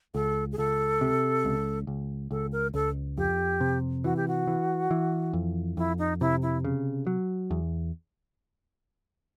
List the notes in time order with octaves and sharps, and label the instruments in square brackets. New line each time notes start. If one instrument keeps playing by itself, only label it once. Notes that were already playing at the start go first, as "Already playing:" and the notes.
[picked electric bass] C#2 [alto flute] A4
[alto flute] G#4
[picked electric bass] C#2 [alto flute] A4
[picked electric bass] C3
C#2
C#2
[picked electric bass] C#2 [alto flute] A4
[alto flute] A#4
[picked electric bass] C#2 [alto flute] A4
[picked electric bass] F2 [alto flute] G4
[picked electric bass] C3
[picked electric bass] E3 [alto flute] F#4
[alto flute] G4
F#4
[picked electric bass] E3
E3
F2
[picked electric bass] F2 [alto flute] E4
[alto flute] D#4
[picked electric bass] C3 [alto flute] E4
[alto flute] E4
[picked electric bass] C#3
F#3
E2